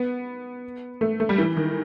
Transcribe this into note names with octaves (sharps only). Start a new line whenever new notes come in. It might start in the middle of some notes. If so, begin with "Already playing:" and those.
Already playing: B3
A3
A3
G3
E3
D#3